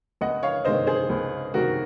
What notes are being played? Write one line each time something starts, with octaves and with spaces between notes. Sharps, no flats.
C#2 D#5 F#5
C#5 F5
C3 D#3 G#3 C5 D#5
G#4 C5
C#2
C3 D#3 G#3 F#4 A#4